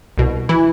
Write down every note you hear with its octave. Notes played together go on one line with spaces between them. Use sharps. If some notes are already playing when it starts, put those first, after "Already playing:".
C2 B2
E3 E4